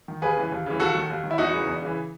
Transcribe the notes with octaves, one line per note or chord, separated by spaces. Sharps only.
D#3
D#2 G#4 B4
C#3 E3
D#2
C#3 E3
D#2 F#4 A4
D#3
D#2
D#3
E4
E2 D#4 F#4
C#3 E3
E2
C#3 E3